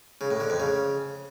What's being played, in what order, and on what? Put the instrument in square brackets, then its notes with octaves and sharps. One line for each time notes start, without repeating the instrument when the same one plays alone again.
[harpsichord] C#3
A2
D3
F2
C#3